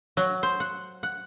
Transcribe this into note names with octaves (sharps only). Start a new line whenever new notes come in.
F#3
C5
F#5
F#5